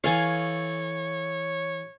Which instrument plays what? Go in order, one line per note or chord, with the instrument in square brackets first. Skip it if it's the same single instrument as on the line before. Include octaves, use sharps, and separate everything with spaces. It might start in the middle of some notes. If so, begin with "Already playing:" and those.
[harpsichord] E3 A4 [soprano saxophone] C#5 [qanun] F5 G#5 C#6